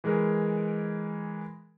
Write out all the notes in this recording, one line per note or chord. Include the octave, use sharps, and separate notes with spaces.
E3 G#3 G#4 A#4